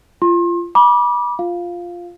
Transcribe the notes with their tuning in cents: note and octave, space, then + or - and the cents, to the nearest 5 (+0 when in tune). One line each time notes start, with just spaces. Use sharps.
F4 -25 C6 +35
B5 -30 D6 +0
F4 +0 F5 +0